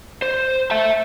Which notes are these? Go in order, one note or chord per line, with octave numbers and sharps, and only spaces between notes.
C5
E5 A5